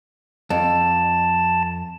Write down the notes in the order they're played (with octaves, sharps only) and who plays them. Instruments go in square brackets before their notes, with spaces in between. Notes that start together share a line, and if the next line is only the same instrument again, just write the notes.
[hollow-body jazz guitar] F2 [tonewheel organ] A5